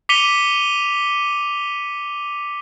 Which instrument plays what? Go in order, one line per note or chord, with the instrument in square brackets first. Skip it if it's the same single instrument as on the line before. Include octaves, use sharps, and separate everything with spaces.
[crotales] D6 B6 C#7 D#7 F7 G7